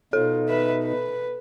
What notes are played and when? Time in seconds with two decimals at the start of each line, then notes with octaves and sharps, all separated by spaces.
0.13 B2 D#4 F4 A4
0.48 B4 E5
0.84 B4